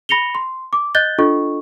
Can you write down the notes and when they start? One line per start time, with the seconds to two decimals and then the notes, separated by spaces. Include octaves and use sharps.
0.09 B5 A#6 C#7 F7 G7
0.35 C6
0.73 D6
0.95 D#5 F#6 G6 A6 G7
1.18 D4 F4 A4 D#5 C#6